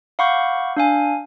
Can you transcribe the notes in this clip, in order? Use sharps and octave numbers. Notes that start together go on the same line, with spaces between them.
F5 F#5 B5 C#6 D6 G6
D4 F5 G#5